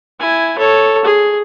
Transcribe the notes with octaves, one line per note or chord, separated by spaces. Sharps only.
E4 G#5
A4 C#5
G#4